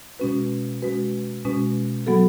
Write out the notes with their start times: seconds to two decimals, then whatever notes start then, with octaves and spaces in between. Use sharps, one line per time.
0.20 B2 G#3 C#4 F#4 B4
0.82 B2 G#3 C#4 F#4 B4
1.45 B2 G#3 C#4 F#4 B4
2.07 F#3 B3 F#4 A4